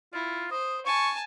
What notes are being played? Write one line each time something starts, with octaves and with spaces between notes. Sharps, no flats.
E4 F4
C5 D#6
G#5 A5 C#6